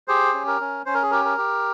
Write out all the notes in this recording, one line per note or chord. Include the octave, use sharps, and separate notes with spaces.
G4 G#4 C5
C#4
A#4
C#4
C#4 C5
A#4
G#4
G4 A#4
A#4
G4